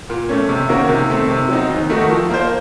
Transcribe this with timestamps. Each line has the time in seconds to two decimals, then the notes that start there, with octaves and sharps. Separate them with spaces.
0.10 A#2
0.29 A3 C#4
0.49 C3
0.69 D#3 A#3 C#4 F#4
0.89 C3
1.09 D#3 A3 C4
1.29 C3
1.49 F#3 C4 D#4
1.69 D#2
1.89 D#3 A3 D#4 F#4
2.10 F3
2.30 A#3 F4 C5